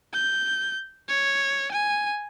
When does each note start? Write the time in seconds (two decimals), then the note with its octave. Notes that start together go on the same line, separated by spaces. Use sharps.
0.14 G6
1.09 C#5
1.72 G#5